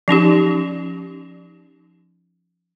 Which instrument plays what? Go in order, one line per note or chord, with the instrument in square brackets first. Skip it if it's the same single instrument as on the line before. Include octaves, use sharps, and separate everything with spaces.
[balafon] F3 C#4 D#4 G4